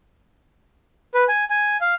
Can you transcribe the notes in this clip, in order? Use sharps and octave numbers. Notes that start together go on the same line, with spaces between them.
B4
G#5
G#5
F5